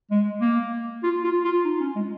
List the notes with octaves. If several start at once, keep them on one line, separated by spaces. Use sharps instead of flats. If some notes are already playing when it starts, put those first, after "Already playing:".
G#3
A#3
F4
F4
F4
D#4
C#4
G#3